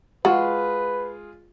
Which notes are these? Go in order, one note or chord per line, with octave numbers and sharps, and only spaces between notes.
G#3 F4 F#4 G#4 B4